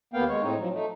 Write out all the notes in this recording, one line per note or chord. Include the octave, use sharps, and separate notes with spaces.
D#2 A#3 B3 F5 G5
G#3 C#5
A2 C4 D#4
F3 F#3
A3 D#4